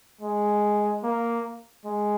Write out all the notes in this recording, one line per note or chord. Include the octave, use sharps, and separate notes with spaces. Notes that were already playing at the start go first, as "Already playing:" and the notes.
G#3
A#3
G#3